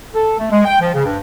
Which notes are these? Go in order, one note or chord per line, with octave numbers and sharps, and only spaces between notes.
A4
A3
G#3
G5
F3
C#3
G2